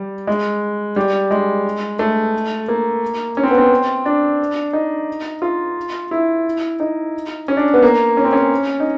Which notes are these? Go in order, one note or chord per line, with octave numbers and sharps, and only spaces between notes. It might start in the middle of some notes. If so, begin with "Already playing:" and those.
Already playing: G3
G#3
G3
G#3
A3
A#3
C#4
C4
B3
C4
D4
D#4
F4
E4
D#4
C#4
D4
B3
A#3
C#4
C4
C#4
D#4